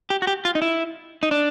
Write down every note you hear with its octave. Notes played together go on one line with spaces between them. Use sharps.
G4
F#4
G4
F4
D#4
E4
D#4
D4